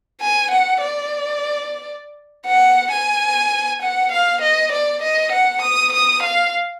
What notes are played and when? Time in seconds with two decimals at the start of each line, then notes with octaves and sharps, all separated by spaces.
0.21 G#5
0.51 F#5
0.81 D5
2.47 F#5
2.91 G#5
3.82 F#5
4.12 F5
4.41 D#5
4.72 D5
5.02 D#5
5.32 F#5
5.62 D#6
5.93 D#6
6.23 F5